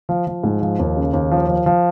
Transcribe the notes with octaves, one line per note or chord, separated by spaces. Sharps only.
F3
F3
G#2
F3
D#2
C#3
D#2
F3
F3
F3